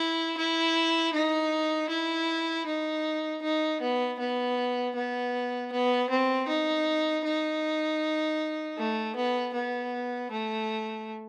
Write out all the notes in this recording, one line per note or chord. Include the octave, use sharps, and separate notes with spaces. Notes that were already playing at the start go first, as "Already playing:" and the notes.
Already playing: E4
E4
D#4
E4
D#4
D#4
B3
B3
B3
B3
C4
D#4
D#4
A3
B3
B3
A3